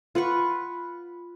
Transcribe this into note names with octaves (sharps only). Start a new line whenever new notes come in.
F4 B4 F#5 C#6